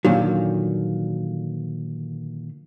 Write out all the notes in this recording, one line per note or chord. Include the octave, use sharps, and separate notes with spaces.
A#2 D3 D#3 F3 F#3